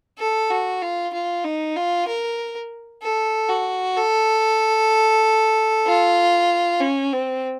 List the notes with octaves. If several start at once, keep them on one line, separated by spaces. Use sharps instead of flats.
A4
F#4
F4
F4
D#4
F4
A#4
A4
F#4
A4
F4
C#4
C4